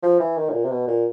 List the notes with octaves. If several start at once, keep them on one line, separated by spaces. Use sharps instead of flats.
F3
E3
D#3
A2
A#2
C3
B2
A#2